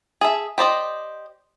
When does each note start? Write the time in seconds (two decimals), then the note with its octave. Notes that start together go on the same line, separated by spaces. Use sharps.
0.21 G#4 A4 E5
0.58 G4 C5 D5 D#5